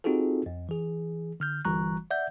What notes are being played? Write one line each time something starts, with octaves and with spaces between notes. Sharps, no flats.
C4 D#4 F4 F#4 G#4 A4
F2
E3 G#4
D3 F6 G6
G1 E3 G3 A#5 C#6 F#6
D5 E5 F#5 G6